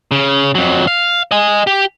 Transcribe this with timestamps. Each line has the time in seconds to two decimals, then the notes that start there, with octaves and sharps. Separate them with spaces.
0.11 C#3
0.55 F2 F#3
0.87 F5
1.31 D#5 G#5
1.67 G4